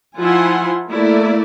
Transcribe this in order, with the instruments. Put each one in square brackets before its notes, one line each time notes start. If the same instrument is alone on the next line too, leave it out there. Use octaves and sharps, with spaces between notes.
[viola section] F3 E4 F4 F#5 G#5 C6
A3 A#3 E4 D5